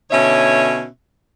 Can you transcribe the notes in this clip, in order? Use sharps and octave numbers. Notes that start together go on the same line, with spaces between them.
B2 D3 C#4 D#4 C#5 E5